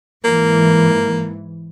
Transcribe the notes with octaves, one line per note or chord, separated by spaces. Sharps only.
G#2 E3 A#3